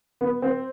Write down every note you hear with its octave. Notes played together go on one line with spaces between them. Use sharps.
B3
C4